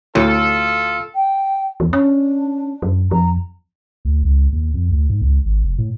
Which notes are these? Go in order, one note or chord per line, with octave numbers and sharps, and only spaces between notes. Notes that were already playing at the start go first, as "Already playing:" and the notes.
D2 A2 F4 A4
G5
E2
C#4 D4
F#2
F2 A#5
D2
C#2
D#2
F2
D2
G#2
C#2
G#1
F1
A2